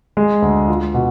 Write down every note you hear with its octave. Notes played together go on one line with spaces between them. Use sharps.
G#3
D2
F4
B2